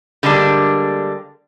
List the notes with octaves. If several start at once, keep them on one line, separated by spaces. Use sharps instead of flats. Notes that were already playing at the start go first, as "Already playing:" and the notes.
D3 G3 G#3 A#3 D4